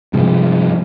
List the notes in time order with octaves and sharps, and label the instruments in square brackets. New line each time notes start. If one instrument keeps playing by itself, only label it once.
[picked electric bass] G2 C3 F3 G#3